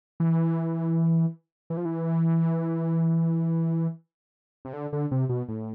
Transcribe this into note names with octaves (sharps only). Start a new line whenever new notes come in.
E3
E3
F3
E3
C3
D3
D3
C3
B2
A2